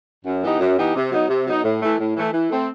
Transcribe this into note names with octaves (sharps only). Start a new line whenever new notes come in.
F#2
E3 B3 D#4 G4
F#2
E3 B3 D#4 G4
C3
F#3 B3 D#4
C3
F#3 B3 D#4
A2
E3 A3
A2
E3 A3
E3
A3 C4